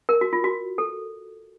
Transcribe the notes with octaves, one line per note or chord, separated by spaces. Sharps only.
A#4
F#4
F4
F#4
A4